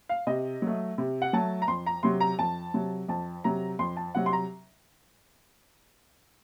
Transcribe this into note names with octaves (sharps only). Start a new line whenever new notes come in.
F5
C3 D#5
F#3 A3
C3
F#5
F#3 A3 A5
A#5
F2 C6
A#5
C3 F#3 C6
A#5
F2 A5
C3 F#3
F2 A5
C3 F#3 A#5
F2 C6
A5
C3 F#3 F#5
C6
A#5